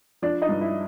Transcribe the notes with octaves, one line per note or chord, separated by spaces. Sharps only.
F3 D4 D5
D#4 D#5
G2
E4 E5